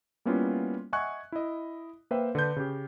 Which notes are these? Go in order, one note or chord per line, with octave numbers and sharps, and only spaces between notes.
G3 A#3 B3 C#4 E4 F4
D#5 E5 F#5 G#5 C#6 F#6
E4 D#5
A#3 B4 C5 E5 G5
D3 B4 G6
C#3 G4